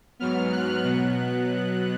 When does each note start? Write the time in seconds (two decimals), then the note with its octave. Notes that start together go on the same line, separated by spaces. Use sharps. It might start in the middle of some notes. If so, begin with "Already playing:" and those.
0.19 G#2 F#3 B3 F6
0.52 F#6
0.84 B2 F#3 B3 F#6